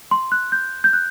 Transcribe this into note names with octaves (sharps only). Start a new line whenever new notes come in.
C6
F#6
G6
G6
F#6